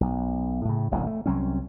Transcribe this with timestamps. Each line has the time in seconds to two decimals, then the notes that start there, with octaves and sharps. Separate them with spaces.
0.01 B1
0.65 A2 C#3
0.91 E1 A1 C3 G#3
1.07 A3
1.26 C2 F#3 C4 C#4